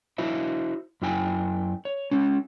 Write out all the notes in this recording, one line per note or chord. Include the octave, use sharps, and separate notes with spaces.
E4 F#4 C5 E5
F#2 E4 G5 G#5
C#5
G#3 C#4